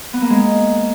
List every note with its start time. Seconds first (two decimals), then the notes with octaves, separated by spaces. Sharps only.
0.13 B3
0.22 A#3
0.30 G#3